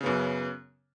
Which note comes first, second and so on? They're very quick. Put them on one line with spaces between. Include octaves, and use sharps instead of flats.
C#3 B3 F#2